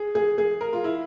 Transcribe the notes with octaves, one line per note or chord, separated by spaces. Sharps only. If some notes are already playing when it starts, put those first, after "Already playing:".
Already playing: G#4
G#4
G#4
A#4
F4
E4